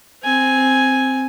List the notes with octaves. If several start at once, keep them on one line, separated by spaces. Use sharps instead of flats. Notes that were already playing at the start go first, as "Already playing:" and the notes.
C4 G#5